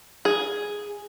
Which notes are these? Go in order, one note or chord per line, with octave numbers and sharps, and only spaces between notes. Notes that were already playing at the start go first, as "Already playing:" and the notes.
G#4